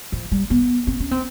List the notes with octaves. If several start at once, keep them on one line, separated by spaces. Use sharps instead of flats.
F3
G3
B3
C4
C#4
C4